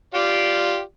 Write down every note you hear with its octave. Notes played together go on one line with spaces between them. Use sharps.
F4 G4 D5